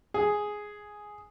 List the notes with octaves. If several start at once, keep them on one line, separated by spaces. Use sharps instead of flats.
G#4